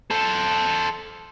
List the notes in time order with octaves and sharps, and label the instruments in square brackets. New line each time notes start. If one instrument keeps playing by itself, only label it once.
[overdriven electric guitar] A4 C5